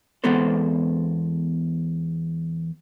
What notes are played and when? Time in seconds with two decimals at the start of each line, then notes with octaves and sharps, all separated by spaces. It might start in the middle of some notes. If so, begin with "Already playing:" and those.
0.24 E2 G#3 B3 C4 A4 C5